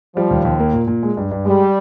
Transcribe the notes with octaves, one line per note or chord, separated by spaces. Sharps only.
F3 G3
D#2
D#2
A#3
A#2
A#2
G#3
G2
G2
G3 G#3